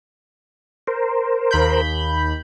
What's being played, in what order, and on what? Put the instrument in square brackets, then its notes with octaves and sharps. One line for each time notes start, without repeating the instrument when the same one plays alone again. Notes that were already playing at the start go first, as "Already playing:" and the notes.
[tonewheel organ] A#4 C5
[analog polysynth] D#2 B5 G6